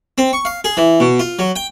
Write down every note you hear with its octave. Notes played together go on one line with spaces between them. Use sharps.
C4
C#6
F5
G#4
E3
B2
F4
F#3
G5